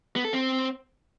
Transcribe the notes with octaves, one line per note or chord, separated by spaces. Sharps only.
B3
A4
C4